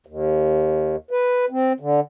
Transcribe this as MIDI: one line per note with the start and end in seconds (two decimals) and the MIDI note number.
0.07 0.96 39
1.11 1.45 71
1.50 1.73 60
1.80 2.00 50